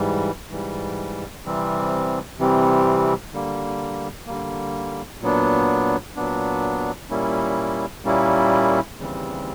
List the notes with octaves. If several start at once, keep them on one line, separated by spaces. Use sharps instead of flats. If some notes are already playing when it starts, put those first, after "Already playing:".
Already playing: G#2 E3 G3
G#2 E3 G3
C3 E3 G3 C4
C3 E3 G3 C4
D3 G3 A#3
D3 G3 A#3
A#2 F#3 B3 D4
A#2 F#3 B3 D4
A#2 G3 A#3 C#4 E4
A#2 G3 A#3 C#4 E4
D#2 C#3 E3 G3 C4